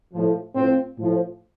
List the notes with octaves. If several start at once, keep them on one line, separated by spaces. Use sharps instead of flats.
A2 F3
A2 F3 C4
A2 F3